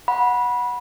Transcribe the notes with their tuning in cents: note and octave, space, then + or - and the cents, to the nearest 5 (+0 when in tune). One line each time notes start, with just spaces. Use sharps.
F#5 -15 B5 -20